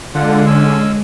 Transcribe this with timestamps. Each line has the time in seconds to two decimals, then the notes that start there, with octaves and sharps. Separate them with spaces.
0.15 D3 G#3 F4 F#5
0.47 C#4 G#5 E6